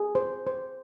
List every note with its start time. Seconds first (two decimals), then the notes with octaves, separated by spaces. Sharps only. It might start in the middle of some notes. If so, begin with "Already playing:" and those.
Already playing: G#4
0.15 C5
0.47 C5